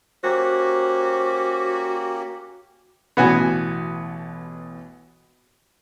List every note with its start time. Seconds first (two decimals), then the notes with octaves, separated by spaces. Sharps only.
0.24 A#3 C#4 F#4 G4 C5
3.17 A1 B2 E3 B3 F#4 G#5